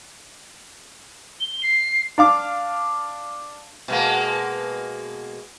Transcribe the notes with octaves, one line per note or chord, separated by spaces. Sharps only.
G7
C7
D4 F5 D6
B2 G#3 A#3